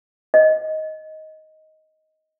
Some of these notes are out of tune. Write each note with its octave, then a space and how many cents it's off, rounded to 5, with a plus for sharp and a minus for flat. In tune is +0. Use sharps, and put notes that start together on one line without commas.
D#5 +10